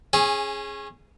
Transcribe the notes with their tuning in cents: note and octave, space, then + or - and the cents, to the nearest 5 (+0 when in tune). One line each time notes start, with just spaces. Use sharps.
C#4 -25 G#4 +0